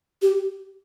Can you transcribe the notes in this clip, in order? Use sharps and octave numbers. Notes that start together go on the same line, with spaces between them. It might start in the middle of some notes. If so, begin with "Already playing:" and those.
G4